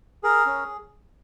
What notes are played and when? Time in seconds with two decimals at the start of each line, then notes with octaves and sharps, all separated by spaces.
0.23 G#4 A#4
0.46 C#4